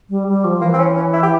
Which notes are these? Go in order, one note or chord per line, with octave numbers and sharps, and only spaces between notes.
G3
G3
F3
E3 A#3
C4
C#4
C#4
E4
G4